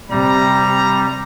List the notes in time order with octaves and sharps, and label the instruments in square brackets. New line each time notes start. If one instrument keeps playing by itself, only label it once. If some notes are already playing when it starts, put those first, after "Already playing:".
[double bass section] C3 [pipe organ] G3 [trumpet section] A#5